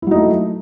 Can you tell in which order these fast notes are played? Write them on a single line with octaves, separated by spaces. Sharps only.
E4 F#3 D#4 A3